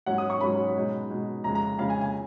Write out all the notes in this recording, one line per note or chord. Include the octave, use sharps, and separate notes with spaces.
G#2 F#3 C#4 F#5
D#6
C#6
G#2 F#3 C#4 B5
B2 G#3 D#4
B2 G#3 D#4
F2 C#3 G#3 A#5
A#5
F2 C#3 G#3 F5
G#5
G#5